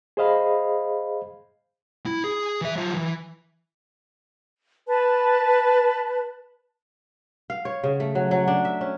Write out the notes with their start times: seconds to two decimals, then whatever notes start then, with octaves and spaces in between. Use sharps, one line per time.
0.17 G#4 C5 D#5 F5 B5
2.06 E4
2.24 G#4
2.61 E3 E5
2.75 F#3 F4
2.94 E3 E4
4.87 B4 A5
7.50 F5
7.65 C#5
7.84 C#3
8.00 A3
8.15 F#3
8.31 F#3
8.48 D4
8.65 E5
8.81 C#4